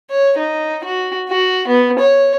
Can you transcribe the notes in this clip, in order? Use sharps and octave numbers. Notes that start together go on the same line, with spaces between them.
C#5
D#4
F#4
F#4
B3
C#5